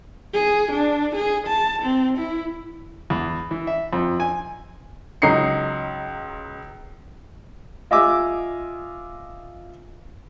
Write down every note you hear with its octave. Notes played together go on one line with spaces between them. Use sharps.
G#4
D4
G#4
A5
C4
E4
E2
E3
E5
F2
G#5
C#2 F#3 D#4 C7 C#7
F4 D#5 E5 G#5 D6 E6